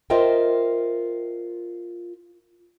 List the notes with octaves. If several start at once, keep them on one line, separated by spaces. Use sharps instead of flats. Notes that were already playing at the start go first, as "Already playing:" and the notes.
F4 A#4 C5 D#5 E5 G5